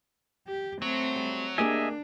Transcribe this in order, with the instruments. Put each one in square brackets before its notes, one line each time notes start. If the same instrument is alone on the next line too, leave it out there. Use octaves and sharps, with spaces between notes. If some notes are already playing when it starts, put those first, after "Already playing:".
[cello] G4
[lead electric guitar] F#3 [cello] A3 C4
[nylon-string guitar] G3
[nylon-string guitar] A#3 G4 G#4 [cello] D4 [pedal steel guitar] D#5 E5 G#5